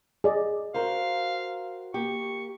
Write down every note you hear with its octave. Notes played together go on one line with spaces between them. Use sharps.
G#4 D5 D#5
F#4 A#4 C5 F5
A#3 G4 C#6